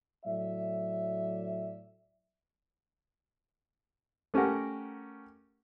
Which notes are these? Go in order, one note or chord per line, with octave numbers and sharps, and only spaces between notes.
A2 F#3 D5 E5
A3 C#4 G4 A#4 F#5